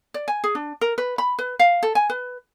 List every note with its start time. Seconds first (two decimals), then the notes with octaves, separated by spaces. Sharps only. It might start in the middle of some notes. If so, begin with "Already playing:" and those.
0.14 D5
0.28 G#5
0.44 G#4
0.55 D4
0.81 A#4
0.98 B4
1.18 B5
1.39 B4
1.59 F5
1.83 A4
1.95 G#5
2.10 B4